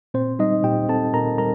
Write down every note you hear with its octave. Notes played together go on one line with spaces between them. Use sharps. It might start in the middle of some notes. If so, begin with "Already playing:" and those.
A#2 C4 C5
G3 D#4 D#5
A#2 G4 G5
C4 A4 A5
A#2 A#4 A#5
G3 A#4 A#5